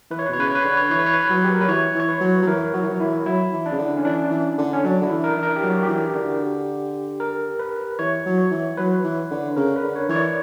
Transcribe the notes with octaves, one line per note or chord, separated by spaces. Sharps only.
E3 B4
C#5
B4
B2
C#5
C#3 B4
C#5
B4
D3 C#5
B4
C#5
B4
E3 C#5
B4
C#5
B4
C#5
F#3 B4
G4
A#4
F#3 B4
E3 C#5
E3
C#5
B4
F#3
F#3
E3 A#4
F#3 F#4
E3
F#3
E3 E4
F#3 E4
E3
D4
C#3
D3
C#4
E3 D4
E3
D3
C#4
F#3 D4
D3 E4
E3
A#4
E3
A#4
G4
F#3
F#4
F#3 G4
E3
D3
A#4
B4
E3 C#5
F#3
C#5
E3
F#3 B4
E3
D3
C#3 A#4
B4
D3
C#5
E3 C#5
D5